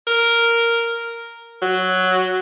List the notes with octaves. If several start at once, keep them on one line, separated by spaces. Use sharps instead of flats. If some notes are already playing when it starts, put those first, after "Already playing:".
A#4
F#3